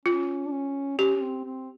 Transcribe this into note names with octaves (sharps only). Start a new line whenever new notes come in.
C#4 F4
D4
C#4
C#4 G4
C#4
C4
C4